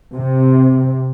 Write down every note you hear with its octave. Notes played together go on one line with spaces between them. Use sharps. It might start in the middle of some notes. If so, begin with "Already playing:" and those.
C3